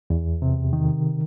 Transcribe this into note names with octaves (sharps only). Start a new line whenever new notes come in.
E2
C3
D#3